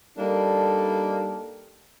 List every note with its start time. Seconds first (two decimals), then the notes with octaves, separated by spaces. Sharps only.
0.18 G3 A#3 D4 D#4 A4